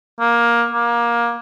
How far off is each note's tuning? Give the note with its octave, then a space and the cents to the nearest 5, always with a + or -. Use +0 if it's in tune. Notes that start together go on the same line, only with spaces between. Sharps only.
A#3 +15
A#3 +20